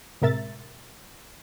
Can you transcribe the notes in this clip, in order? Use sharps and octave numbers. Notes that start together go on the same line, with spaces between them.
A2 C3 G#3 A#4 E5 A6